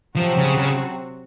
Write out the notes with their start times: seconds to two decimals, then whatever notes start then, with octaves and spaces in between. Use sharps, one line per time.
0.16 C3 F3 F#3 C4 F#4
0.37 C#3
0.58 C#3